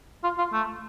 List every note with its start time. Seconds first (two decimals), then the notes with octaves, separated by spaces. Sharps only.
0.23 F4
0.38 F4
0.53 A3